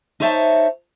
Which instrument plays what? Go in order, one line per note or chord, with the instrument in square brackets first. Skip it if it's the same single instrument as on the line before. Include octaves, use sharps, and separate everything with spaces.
[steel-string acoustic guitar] D#4 C5 C#5 E5 F#5 A5